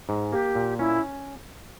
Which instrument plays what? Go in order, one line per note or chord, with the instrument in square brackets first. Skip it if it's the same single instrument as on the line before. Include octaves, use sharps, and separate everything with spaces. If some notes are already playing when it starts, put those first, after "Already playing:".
[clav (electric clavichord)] G#2
[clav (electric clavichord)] A#3 [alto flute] G4
[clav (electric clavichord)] A#2
[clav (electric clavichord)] C#4 [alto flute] E4